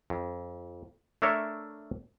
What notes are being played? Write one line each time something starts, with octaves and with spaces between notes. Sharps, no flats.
F2
A3 D4 A4 A#4 C#5 E5